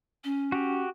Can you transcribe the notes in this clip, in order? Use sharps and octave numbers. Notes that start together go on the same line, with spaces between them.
C#4
F#4 G4